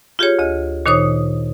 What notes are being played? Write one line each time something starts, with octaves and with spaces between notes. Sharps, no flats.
F4 G4 G#4 C#5
D2 D#5
A#2 D#3 D#4 C5 C#5 D#6